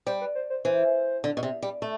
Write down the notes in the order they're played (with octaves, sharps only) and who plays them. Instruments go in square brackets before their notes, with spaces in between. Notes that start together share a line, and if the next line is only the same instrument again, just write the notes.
[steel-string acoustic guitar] G3 [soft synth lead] C5
[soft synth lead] B4
C5
C5
[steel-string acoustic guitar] E3 [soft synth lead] C5
[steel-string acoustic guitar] D3
B2
C3
G3
A3